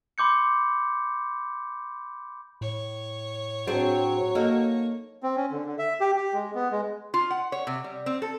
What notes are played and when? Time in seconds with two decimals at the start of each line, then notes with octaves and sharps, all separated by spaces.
0.18 B5 C6 D6 G6 C#7
2.61 A2 C#5
3.67 F#3 C4 D4 G#4
4.35 A#3 D#4 A4
5.23 C4
5.36 C#4
5.51 D3
5.66 D3
5.79 E5
6.01 G4
6.16 G4
6.33 G#3
6.55 B3
6.71 G#3
7.14 F4
7.31 F#5
7.52 C#5
7.67 C3
7.84 G3
8.06 C4
8.22 A4